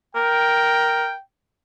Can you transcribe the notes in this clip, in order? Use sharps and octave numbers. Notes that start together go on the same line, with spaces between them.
A#4 G5